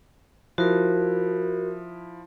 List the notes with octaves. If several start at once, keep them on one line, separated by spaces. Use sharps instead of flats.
F3 E4 F#4 A#4